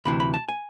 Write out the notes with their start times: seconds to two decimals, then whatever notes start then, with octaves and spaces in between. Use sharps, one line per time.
0.05 D2 C3 E3 B5
0.20 B5
0.34 A5
0.48 G#5